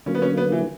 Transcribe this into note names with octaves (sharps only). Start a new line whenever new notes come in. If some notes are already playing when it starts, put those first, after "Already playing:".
D3 F#3 A#3 C#4
B3
C#4
B3
E3